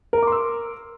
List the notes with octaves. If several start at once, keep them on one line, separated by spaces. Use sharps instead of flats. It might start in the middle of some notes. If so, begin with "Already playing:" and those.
A#4 A#5 C6 D6 E6